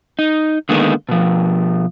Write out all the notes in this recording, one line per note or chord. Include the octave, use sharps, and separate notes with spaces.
D#4
D3 D#3 G#3 A#3 B3 D#4
B2 F3